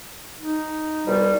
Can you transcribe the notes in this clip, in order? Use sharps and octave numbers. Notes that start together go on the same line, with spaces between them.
D#4
C2 B2 G3